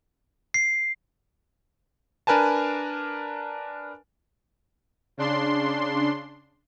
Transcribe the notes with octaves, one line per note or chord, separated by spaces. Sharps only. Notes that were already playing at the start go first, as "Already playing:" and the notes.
C7
D4 A#4 B4 G#5 A5
C#3 D4 C6